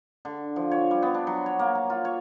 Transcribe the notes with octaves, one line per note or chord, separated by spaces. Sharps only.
D3
F3
C#5
G3
B3
D4
F#3
C#5
A#3
A#5
F4
C#5